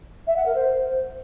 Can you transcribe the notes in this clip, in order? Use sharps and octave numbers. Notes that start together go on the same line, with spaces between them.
E5
F#5
A#4
C5